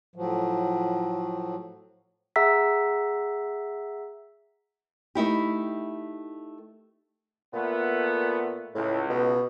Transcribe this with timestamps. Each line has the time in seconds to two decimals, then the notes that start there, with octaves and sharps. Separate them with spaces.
0.16 A2 F3 F#3
2.36 G#4 E5 F#5 A#5 E6 B6
5.15 A3 D#4 E4 G4
7.53 A#2 A3 B3
8.75 C#2 A2
9.10 B2